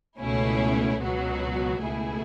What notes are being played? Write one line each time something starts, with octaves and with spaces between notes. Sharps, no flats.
C#2 B2 A3 C#4 E4
C#2 B2 F#3 B3 F#4
C#2 B2 A3 E4 G#4